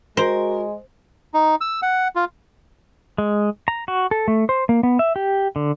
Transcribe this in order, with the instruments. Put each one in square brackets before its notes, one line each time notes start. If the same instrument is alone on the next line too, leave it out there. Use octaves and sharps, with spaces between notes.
[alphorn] G#3 [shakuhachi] F#4 [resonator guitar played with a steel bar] A#4 [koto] C5
[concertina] D#4
E6
F#5
F4
[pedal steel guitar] G#3
A#5
F#4
A4
A3
C5
A#3
B3
E5
G4
D3